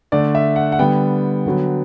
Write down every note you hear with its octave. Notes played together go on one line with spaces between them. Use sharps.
D3 A3 D5
E5
F#5
F#5
D3 G3 B3 G5
D3 F#3 B3